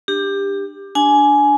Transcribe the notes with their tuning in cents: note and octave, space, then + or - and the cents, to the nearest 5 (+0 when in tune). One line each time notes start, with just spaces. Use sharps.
D4 +15 G4 +15
D4 +0 G#5 +15